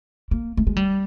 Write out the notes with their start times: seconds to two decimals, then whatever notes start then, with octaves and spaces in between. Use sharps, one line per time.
0.31 A#3
0.57 A3
0.67 G#3
0.76 G3